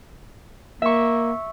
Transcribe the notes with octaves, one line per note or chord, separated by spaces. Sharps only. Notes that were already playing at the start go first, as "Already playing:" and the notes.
A#3 E5 C#6